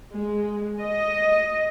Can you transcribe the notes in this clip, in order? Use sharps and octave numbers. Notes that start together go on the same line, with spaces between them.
G#3
D#5